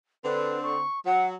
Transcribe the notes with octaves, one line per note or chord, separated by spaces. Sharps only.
D3 C4 B4
C#6
F#3 F#5